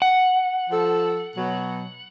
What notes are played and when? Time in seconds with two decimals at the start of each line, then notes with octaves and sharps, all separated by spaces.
0.02 F#5
0.71 F3 A4
1.36 B2 F#3